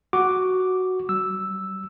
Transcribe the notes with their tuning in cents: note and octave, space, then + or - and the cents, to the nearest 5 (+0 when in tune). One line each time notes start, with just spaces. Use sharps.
F#4 +0 D6 +0
G3 -35 E6 +0